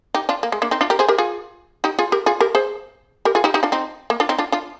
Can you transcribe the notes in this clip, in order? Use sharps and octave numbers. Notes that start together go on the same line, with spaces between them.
D#4 G4
D4 F4
A#3
G#3
A#3 D4
C4 D#4
D4 F4
G4 A#4
G#4 C5
G4 A#4
F4 G#4
D#4 G4
F4 G#4
G4 A#4
F4 G#4
G4 A#4
G#4 C5
G4 A#4
F4 G#4
D#4 G4
D#4 G4
D4 F4
C4 D#4
A#3
D4 F4
C4 D#4
D4 F4
D4 F4